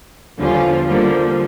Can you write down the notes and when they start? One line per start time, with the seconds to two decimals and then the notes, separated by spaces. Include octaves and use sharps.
0.38 E2 D3 F3 G3 C#4 F4
0.88 D3 F3 G3 A#3